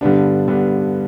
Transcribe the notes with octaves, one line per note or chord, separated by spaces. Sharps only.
G2 D3 G3 B3 D4
G2 D3 G3 B3 D4